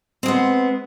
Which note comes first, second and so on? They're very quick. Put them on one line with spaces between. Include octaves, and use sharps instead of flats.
C4 G#3 B3